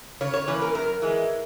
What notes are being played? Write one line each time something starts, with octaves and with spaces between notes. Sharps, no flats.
C#3 C#5
C#5
E3 A#3 C#4 B4
A#4
F#2 A#4
E3 G#3